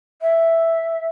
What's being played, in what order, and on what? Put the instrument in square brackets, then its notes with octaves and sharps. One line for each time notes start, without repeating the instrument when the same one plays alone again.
[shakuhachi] E5